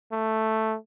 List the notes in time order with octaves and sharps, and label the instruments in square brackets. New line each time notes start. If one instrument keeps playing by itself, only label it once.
[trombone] A3